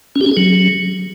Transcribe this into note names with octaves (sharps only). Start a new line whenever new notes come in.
C#4
G4
C#4
G#4
F#3